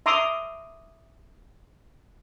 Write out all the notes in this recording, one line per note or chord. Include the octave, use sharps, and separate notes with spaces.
E5 A#5 C6 D6 D#6